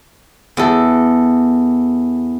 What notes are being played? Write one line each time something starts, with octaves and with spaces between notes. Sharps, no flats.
E2 A4